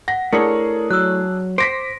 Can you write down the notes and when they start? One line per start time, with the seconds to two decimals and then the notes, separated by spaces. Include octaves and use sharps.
0.08 F#5 A#6
0.33 A3 D4 E4 G#4 A#4 C#5 C#7
0.91 F#3 E6 F#6
1.58 C5 D6 A#6 B6 D7